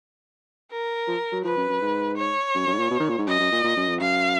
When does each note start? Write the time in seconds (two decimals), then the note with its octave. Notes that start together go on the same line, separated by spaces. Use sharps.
0.71 A#4
1.08 F3
1.32 F#3
1.45 F3 B4
1.57 F#2
1.69 F#2
1.82 G#2
2.17 C#5
2.55 F#2
2.67 F#2
2.73 G#2
2.79 A#2
2.91 B2
3.00 D#3
3.09 A#2
3.18 G#2
3.27 F#2 D#5
3.40 F#2
3.52 A#2
3.64 A#2
3.76 F#2
3.88 F2
4.00 F#2 F5